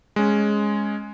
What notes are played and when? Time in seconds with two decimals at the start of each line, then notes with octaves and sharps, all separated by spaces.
0.16 G#3 C#4